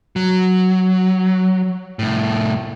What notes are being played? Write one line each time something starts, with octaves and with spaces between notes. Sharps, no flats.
F#3
C2 A2